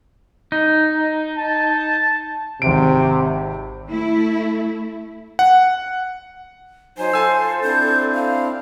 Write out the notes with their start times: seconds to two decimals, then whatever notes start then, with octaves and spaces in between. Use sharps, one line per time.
0.52 D#4
1.37 A5
2.62 G#1 C3 D7
3.90 A3 E4
5.39 F#5
6.98 F#3 D#4 C5 G#5
7.13 F4 A4 G#5 E6
7.63 C4 D4 E4 G6
8.15 F5